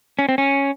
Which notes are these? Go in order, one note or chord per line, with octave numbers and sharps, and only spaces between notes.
C#4
C4
C#4